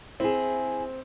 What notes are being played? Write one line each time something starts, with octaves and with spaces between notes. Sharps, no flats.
C4 E4 G#4